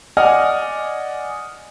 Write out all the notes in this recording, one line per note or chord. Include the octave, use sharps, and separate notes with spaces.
D5 D#5 F#5 G#5 F6